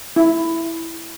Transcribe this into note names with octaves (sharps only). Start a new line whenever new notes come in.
E4